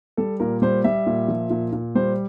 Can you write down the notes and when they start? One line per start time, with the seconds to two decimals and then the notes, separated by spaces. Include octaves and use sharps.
0.17 G3 A4
0.40 A#2 A#4
0.62 G3 C5
0.84 G3 E5
1.06 A#2
1.28 F3
1.50 A#2
1.72 A#2
1.95 G3 C5